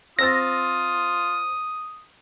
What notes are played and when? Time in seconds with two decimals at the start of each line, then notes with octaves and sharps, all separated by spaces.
0.19 C4 F4 D#6 E6 A6 A#6